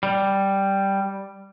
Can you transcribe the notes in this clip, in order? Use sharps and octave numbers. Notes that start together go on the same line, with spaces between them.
G3